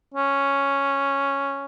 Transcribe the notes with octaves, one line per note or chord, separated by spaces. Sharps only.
C#4